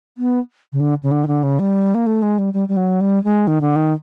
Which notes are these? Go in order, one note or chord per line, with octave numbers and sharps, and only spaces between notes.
B3
C#3
D3
C#3
D3
D#3
D3
C#3
G3
A#3
A3
G#3
G3
G3
G3
F#3
G3
G#3
D#3
D3
D#3